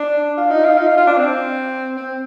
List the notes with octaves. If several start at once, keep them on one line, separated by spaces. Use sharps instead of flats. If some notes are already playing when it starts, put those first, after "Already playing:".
Already playing: D4
F4
D#4
F4
D#4
F4
F4
D4
C4
C4